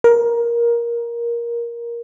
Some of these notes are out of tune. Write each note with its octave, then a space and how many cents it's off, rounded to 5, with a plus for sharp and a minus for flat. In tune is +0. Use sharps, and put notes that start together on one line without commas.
A#4 +15